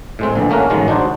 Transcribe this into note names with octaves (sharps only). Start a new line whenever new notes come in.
A2 G#3 C4
A#1 D3 E3
A3 A#3 C#4 A#4 F#5
A1 D#3 F#3 G#3
D4 D#4 F#4 C5 D5